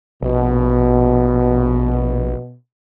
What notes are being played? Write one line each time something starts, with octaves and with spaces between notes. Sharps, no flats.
A#1 B2